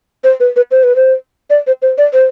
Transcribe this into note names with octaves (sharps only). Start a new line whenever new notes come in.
C5
B4
B4
C5
B4
C5
D5
C5
C5
D5
C5